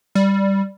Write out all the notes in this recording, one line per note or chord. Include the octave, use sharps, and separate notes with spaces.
G3